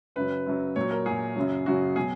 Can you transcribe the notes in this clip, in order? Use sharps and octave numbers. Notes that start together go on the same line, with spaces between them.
F#2 C#3 F#3 B4
F#2 C#3 F#3
A#2 F#3 C#5
A#4
A#2 F#3 G#4
F#2 C#3 F#3
F#2 C#3 F#3 F#4
B2 F#3 G#4